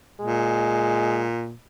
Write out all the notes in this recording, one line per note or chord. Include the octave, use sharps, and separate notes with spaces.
A#2 G#3